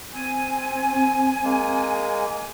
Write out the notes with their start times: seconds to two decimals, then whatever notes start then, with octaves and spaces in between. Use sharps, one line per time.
0.14 C4 G#5
1.44 G#3 A#3